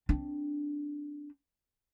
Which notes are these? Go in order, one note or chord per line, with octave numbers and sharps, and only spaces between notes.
C4 D4